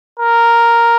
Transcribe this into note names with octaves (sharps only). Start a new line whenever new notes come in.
A#4